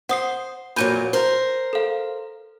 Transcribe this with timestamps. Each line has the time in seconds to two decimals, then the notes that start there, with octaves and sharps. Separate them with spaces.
0.09 C5 F#5 D#6 C7
0.76 F2 A#2 F#3 B5 G6 D#7
1.13 A#4 C5
1.73 A4 F5